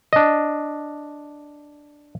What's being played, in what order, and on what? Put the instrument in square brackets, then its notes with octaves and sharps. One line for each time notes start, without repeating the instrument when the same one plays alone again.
[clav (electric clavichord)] D4 D#5